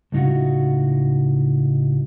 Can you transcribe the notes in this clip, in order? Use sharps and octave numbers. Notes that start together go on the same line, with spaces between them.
C#2 A2 D#4 F4 F#4